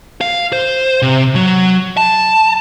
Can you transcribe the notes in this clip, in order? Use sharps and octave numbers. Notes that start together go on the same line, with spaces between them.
F5
C5
C3
F#3
A5